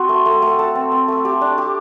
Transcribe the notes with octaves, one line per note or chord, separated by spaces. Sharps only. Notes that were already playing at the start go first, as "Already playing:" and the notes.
Already playing: C4 F#4 C5
A3
A3
A3
A4
C4
C4
A3
G4
D4
G4